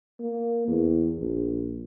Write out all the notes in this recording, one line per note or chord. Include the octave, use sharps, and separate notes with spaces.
A#3
E2
A#1